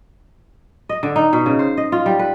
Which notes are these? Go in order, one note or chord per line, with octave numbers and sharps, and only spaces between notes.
D#5
D3
D#4
B2
C#3
C5
D#5
F4
G3
B4